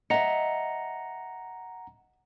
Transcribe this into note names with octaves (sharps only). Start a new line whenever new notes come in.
D#5 E5 F#5 A#5 C#7